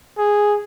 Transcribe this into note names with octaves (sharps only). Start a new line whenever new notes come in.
G#4